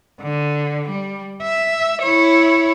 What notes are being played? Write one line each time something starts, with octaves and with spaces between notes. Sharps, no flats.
D3
G3
E5
E4 C#5